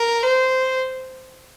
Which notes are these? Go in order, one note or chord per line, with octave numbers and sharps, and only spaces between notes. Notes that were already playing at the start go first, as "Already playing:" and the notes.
Already playing: A#4
C5